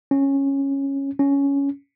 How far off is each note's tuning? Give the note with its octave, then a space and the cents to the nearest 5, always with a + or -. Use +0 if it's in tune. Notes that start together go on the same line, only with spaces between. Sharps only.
C#4 -10
C#4 +10